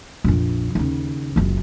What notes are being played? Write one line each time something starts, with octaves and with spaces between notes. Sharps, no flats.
A#1 F2
D#2 C#3
F#1 C#2